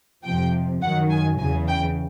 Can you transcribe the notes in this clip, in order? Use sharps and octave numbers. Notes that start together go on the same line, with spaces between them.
F2 C3 F3 G5
F#2 D#3 F#3 F#5
G#5
E2 C#3 E3 G#5
G5